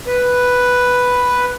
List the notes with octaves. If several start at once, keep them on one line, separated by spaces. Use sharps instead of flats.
B4